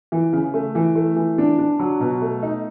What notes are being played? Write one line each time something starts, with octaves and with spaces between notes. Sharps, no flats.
E3
C#3
A3
E3
A3
E3
D4
D4
F#3
B2
A3
D#4